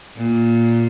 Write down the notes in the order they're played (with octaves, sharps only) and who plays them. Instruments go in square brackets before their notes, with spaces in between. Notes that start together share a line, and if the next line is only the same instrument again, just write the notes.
[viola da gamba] A#2